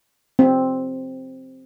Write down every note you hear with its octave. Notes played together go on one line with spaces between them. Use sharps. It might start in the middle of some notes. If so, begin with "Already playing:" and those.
C4